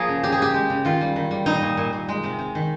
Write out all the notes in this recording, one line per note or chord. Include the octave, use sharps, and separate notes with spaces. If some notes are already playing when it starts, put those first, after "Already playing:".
Already playing: F3 A#3 G#4 A#4
C#3
C#3 G4
G#4
C#3 G4
G#3
C#3
D#3 F4
G3
D#3
G3
A#2 D#4
A#2
A#2
A#2
G#3
C3
C3
D#3